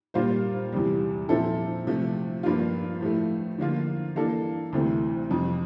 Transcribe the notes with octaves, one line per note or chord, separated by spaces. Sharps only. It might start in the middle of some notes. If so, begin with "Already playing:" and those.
A#2 G3 A#3 F4 C5
E2 C3 G3
A#2 F3 C4 E4 A4
C3 F3 A3
G2 F3 A#3 D4 F4
A2 F3 A3
D3 F3 A#3 F4
E3 A#3 D4 A4
D2 C3 E3 A3 C4
F2 C3 F3